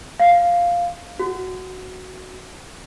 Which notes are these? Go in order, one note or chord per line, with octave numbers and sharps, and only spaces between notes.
F5
F#4